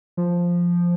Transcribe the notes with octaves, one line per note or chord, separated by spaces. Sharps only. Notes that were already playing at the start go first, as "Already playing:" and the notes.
F3